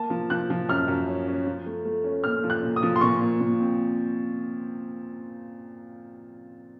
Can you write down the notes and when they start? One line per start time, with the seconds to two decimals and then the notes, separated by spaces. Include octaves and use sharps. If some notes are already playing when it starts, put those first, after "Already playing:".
Already playing: A#3 A5
0.10 F3
0.30 F3 F#6
0.50 F3
0.69 F#2 F6
0.88 F#2
1.08 C#4
1.27 C#4
1.47 F3
1.66 A3
1.85 A3
2.04 C#4
2.24 A#2 F6
2.44 F3
2.50 F#6
2.63 A#2
2.76 D#6
2.83 F3
2.96 C6
3.01 A#2 C#6
3.21 A#2
3.41 A#2
3.60 C4